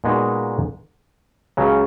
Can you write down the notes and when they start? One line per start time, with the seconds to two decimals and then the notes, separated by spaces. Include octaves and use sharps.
0.04 A#2 G#3 B3 D#4 F#4
1.57 C#2 C#3 F#3 C#4 F#4